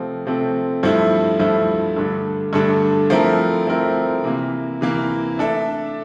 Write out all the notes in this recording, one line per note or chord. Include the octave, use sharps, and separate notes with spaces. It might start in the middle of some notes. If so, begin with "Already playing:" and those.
Already playing: C3 F3 A3 C4
C3 F3 A3 C4
G2 F3 A3 E4
G2 F3 A3 E4
G2 D3 A3 D4 A4
G2 D3 A3 D4 A4
F3 A3 C4 E4 A#4
F3 A3 C4 E4 A#4
C3 E3 A#3
C3 E3 A#3
A3 D4 A4 E5